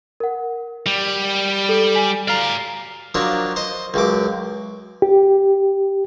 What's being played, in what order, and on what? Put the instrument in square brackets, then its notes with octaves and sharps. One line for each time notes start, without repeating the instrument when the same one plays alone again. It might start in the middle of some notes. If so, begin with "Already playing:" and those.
[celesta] A#4 F#5
[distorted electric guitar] G3
[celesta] A4
G#5 B6
[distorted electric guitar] D5 F5 [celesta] A#5 F6
[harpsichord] F3 F#3 A#3 D4
C5 D#5
C#2 F#2 D6
[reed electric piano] G4